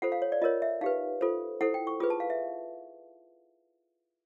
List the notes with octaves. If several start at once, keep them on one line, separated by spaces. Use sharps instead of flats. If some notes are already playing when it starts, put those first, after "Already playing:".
F4 A4 C5 F#5
F5
C#5
D5
F4 A#4 C#5 D#5
E5
D#4 G4 B4 F5
F4 A4 C5
E4 A4 C5 F#5
G5
C#6
F4 G#4 B4 D#6
A5
F5
E5